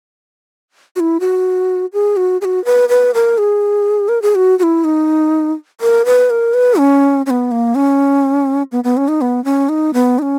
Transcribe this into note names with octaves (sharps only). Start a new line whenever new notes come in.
F#4
E4
F#4
G#4
F#4
G#4
F#4
B4
B4
A#4
G#4
A#4
G#4
F#4
F#4
E4
D#4
A#4
B4
A#4
B4
C#4
C#4
B3
A#3
C#4
B3
B3
C#4
D#4
B3
C#4
D#4
B3
D#4
C#4